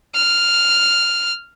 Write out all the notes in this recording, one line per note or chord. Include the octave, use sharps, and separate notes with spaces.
F6